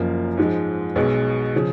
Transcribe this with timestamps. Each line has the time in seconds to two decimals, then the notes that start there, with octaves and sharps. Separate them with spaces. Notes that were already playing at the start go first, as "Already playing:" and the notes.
Already playing: F#1 F#2 F3 A#3
0.37 G#2 F3 G#3
0.95 B1 B2 G#3
1.56 C#3 F3